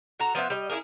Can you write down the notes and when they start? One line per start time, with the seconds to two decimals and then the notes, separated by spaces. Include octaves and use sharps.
0.20 F#4 A4 A#5
0.35 F3 B3 D4 E5
0.50 G3 D#5
0.70 E4 G4 G#4 A#4